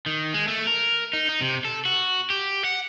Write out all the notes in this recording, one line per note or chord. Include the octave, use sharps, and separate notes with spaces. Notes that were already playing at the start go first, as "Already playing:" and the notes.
D#3
G#3
A3
A#4
D#4
D#4
C3
A4
F#4
G4
F#5